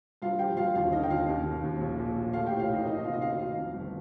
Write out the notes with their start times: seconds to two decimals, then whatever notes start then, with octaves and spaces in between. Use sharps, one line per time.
0.22 G2 F4 F5
0.39 F3 G4 G5
0.57 G2 F4 F5
0.75 D#2 F4 F5
0.92 D3 D#4 D#5
1.03 G5
1.10 D#2 F4 F5
1.28 D#2
1.45 D#3
1.64 D#2
1.80 A#1
1.98 A#2
2.16 A#1
2.33 A3 F4 F5
2.47 A2 G4 G5
2.59 F4 F5
2.69 A1 D#4 D#5
2.86 A#3 D#4 D#5
2.98 D#5
3.04 C3 F4 F5
3.13 D#5
3.21 D2 F4 F5
3.39 D#3 F4 F5
3.57 F2
3.74 G1